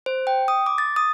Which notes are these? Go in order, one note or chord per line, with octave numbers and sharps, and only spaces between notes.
C5
G5
D#6
D6
A6
D#6